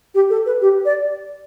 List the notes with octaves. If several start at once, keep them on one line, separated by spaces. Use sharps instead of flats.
G4
A4
B4
G4
D5